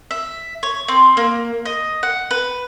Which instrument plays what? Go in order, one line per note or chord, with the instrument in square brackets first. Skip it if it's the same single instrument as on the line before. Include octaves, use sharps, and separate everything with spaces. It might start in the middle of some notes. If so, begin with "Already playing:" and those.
[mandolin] E5
C#5
C4
A#3
D#5
F#5
B4